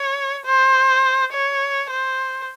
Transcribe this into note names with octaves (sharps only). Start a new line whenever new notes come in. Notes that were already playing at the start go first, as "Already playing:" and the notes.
Already playing: C#5
C5
C#5
C5